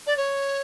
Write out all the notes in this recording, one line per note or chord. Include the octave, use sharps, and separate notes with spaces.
D5
C#5